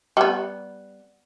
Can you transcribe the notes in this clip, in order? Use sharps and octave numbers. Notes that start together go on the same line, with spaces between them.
G3 B3